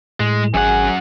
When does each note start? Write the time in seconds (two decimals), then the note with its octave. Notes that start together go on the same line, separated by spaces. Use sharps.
0.20 A2 G#3
0.54 G#1 F#2 G#4 F#5